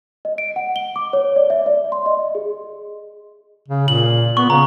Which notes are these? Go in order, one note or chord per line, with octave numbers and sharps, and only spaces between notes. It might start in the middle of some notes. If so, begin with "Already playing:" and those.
D#5
D7
F#5
G7
D6
C#5
D5
E5
D5
C6
D#5
G#4
C#3
A#2 F#7
B3 C#6
C#3 A#5